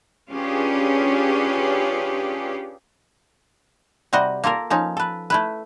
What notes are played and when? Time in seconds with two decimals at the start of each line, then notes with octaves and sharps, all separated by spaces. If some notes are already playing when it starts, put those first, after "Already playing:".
0.31 C#4 D4 F4 G4 G#4 B4
4.13 C3 G3 F#4 D#5
4.44 A#3 F4 A4 A#4
4.70 F3 C#4 D#4
4.97 A4 B4
5.30 A3 E4 B4